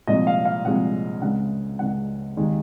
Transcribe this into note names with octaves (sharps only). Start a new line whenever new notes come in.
C2 A#2 F3 G#3 D#5
F5
F5
C2 A#2 F3 G#3 F#5
C#2 C#3 G#3 F#5
C#2 C#3 G#3 F#5
D#2 D#3 G#3